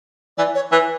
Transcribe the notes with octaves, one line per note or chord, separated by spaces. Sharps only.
E3 D5
C#5
E3 B4